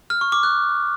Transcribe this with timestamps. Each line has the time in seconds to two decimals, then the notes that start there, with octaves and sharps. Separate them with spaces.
0.10 F6
0.21 C#6
0.32 D6
0.43 F#6